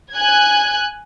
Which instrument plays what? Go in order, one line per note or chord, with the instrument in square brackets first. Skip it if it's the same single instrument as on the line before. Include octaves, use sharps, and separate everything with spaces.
[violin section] G#5 F#6 G#6